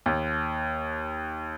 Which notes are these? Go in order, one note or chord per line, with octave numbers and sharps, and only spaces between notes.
D#2